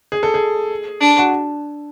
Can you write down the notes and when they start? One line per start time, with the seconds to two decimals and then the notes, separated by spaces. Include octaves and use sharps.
0.12 G#4
0.23 A4
0.34 G#4
1.01 D4
1.18 F#4